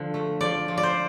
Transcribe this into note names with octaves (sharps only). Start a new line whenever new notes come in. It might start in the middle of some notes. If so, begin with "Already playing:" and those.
Already playing: D3 F3
A3
F3 D5
F3
D5
C5